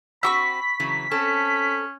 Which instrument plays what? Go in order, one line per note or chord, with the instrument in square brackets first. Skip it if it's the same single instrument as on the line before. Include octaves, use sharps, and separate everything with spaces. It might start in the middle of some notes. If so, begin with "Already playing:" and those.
[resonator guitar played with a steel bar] C4 F#4 [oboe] B5 [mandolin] C#6 D6 E6 [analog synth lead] B6
[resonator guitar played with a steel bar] C#3 E3 F#3
[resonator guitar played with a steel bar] C4 A4 [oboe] C#4